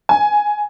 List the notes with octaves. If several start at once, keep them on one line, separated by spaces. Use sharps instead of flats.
G#5